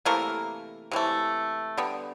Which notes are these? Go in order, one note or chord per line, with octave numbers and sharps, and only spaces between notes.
C3 E3 A3 A#3 A#4
C3 E3 A3
D3 G3 B3